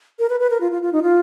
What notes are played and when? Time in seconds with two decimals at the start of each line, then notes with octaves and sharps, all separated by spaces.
0.19 A#4
0.30 B4
0.40 B4
0.50 A#4
0.61 F4
0.71 F4
0.82 F4
0.93 D#4
1.03 F4